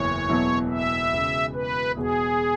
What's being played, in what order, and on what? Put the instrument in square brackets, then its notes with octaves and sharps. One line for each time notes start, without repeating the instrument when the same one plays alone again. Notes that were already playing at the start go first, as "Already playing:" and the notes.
Already playing: [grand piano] F#1 E2 E3 [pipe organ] C#5
[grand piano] E1 E2 B2 F#3 E4
[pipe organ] E5
[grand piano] E1 E2 C#3
[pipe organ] B4
[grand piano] E1 E2 B2 B3 F#4 [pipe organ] G#4